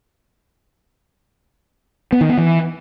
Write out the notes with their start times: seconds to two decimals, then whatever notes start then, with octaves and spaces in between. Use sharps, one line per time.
2.12 B3
2.21 D#3
2.29 B3
2.38 E3